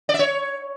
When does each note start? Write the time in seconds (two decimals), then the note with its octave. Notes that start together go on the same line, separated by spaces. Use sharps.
0.09 D5
0.14 E5
0.19 C#5